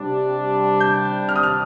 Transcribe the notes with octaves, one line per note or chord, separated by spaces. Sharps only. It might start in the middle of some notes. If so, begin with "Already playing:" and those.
Already playing: C3 G3 D4
G6
F6
D#6
F6